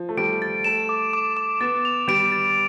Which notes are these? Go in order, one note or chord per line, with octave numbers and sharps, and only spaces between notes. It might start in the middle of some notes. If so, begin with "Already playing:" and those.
Already playing: F3
A3
G3 D7
A6
A3 E7
D6
D6
D6
B3 A6
F7
G3 D7
A6